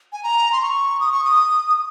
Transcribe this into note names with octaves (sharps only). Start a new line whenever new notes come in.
G#5
A#5
C6
C#6
D#6
C#6
D#6